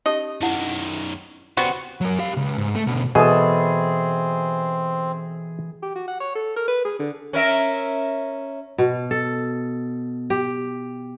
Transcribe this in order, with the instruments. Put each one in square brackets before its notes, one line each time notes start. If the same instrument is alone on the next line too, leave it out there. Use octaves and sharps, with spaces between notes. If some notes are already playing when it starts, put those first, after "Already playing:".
[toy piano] C#4 D#4 G4 [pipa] D#5
[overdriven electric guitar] F#2 D#3 [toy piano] D4 E4 F#5
[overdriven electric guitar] C#3 G3 [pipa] B3 C4 F#4
[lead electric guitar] F#3 A#4
G4 F5
C#2
G#2
A3
B2 D3
[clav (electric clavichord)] B2 [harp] E3 A4 [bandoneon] C4 [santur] G#4
[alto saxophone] G4
F#4
F#5
C#5
A4
A#4
B4
G#4
D3
[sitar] C#4 A#4 E5
[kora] B2
A4
G4